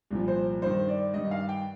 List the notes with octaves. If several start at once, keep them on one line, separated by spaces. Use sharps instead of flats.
C2 A#2 F3
C5
G2 D#3 C5
D5
G2 D#3 D#5
F5
G5